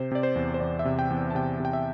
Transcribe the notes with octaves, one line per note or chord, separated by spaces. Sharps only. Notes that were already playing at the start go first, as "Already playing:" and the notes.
Already playing: C3 C5
C3 D5
C5
E2
C5
E2 D5
E5
C3
G5
E2
A5
C3 G5
C3 G5
E5